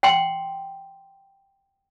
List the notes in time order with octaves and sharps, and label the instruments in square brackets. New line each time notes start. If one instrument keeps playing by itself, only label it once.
[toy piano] F#5 G5 C6